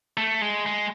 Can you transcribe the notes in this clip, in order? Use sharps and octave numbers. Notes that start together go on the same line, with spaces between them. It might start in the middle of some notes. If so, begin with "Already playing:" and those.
A3
G#3
G#3